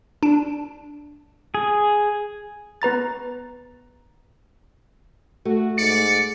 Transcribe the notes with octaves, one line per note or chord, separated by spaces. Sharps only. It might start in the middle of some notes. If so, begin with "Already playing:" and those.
D4
G#4
B3 B4 A#5 A6
A3 F#4
G#2 D5 C#7